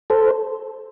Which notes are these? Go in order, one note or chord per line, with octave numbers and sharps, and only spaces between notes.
A4 C5